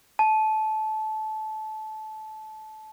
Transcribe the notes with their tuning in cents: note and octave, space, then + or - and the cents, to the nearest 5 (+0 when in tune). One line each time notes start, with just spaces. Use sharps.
A5 -20